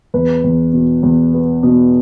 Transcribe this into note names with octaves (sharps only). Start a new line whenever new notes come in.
E2 B4
E2
B2
E2
B3
B2